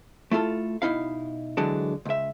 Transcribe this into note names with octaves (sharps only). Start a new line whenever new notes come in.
A3 E4 F4 A4
B2 D#4 E4 F5
D3 E3 F#3 G#3 D4
C#2 E5